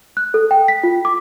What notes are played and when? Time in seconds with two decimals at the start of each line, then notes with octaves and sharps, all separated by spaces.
0.17 F#6
0.34 A4
0.51 G5
0.68 B6
0.83 F4
1.05 D6